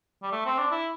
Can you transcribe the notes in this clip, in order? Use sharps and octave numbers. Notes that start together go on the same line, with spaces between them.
G3
A3
C4
D4
E4